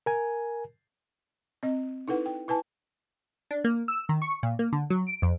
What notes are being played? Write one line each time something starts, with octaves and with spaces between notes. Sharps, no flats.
A#4 G#5
C4 D#5
D#4 E4 A4 B4 F#5
G5
E4 B4 G#5 A5
D4
A#3
E6
D#3
C#6
A#2
A#3
D3
F#3
D7
F2